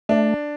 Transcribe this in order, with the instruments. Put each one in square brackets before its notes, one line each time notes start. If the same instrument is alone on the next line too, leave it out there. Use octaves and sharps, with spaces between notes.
[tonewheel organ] A3 [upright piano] D4